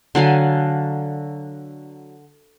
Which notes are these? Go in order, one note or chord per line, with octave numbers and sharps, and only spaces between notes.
D3 F#3 F5 G#5